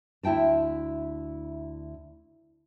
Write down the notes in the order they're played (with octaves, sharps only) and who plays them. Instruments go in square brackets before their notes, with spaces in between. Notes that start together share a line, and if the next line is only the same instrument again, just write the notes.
[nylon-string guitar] D2 E4 E5 G5 A5